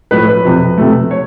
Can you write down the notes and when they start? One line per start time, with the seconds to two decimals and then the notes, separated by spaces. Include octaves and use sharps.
0.11 A2 F3 A3 B4
0.28 B4
0.44 F2 C3 F3
0.78 C3 F3 A3
1.11 C#5